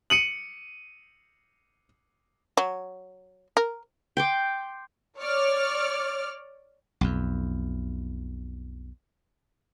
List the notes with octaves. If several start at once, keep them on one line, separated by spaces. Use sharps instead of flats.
C#7 D#7 F#7
F#3
A#4
G5 C6 D6
C#5 D5 F6
B1 F2